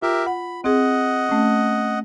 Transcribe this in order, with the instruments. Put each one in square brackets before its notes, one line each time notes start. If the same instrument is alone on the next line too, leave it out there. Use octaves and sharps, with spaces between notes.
[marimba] F4 [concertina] G4 A#4 E5
[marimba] F#5 [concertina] B5
[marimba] C4 G#4 [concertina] D#5 F#5
[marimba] A3 C#4